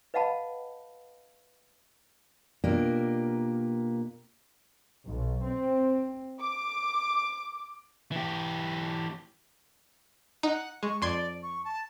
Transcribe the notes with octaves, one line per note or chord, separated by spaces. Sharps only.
B4 D#5 F5 F#5 A5 B5
B2 A#3 D4 F4 G4 A#4
B1
C4
D6
E3 G4
D#4 F#5
G#3 C#6
F2 D5 C6 G#6
C#6
A5